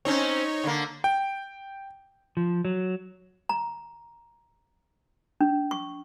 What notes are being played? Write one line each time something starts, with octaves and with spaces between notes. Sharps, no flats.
C4 C#4 D#4 C#5
D3 A#3
G5
F3
F#3
A#5
D4
C#6